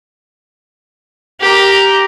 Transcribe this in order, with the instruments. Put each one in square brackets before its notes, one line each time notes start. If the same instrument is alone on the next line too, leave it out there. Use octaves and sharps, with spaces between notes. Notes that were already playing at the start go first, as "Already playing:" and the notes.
[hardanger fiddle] G4 A#4